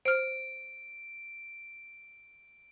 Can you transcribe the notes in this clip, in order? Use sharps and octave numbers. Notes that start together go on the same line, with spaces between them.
C5 F6 D7